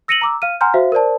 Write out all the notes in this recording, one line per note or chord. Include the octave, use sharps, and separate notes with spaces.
E6 A#6 C#7 D#7 F7 F#7
A#5 D6 E6
F5 F6 D#7
F#5 G#5 A#5 C6 F6 G6
F#4 C5 E5 F5
A#4 C5 D5 A5